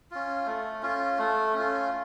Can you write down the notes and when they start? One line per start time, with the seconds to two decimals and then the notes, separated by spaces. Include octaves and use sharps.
0.11 C#4 F4
0.46 A3
0.82 C#4 F4
1.19 A3
1.54 C#4 F4